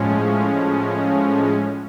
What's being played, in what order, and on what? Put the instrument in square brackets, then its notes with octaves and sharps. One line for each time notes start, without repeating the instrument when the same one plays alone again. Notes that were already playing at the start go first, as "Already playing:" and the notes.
Already playing: [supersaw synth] A2 F3 G#3 C#4